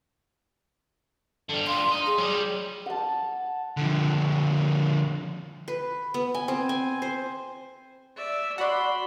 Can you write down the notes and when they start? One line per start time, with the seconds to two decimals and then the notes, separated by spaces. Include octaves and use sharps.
1.49 D3 G3
1.67 D4 F4 C6
1.89 D#5 A#5
2.07 G#4
2.18 F#3 G3
2.86 F#5 A5
3.77 D3 F3
5.68 B4
6.14 B3
6.34 G#5
6.48 C4
6.69 G#5
7.02 C5
8.16 D5 E5
8.58 F#4 D5 F#5 B5 C6